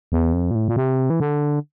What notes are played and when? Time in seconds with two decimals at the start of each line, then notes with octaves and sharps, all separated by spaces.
0.12 E2
0.33 F2
0.51 A#2
0.55 A2
0.68 A#2
0.76 C3
1.10 E3
1.20 D3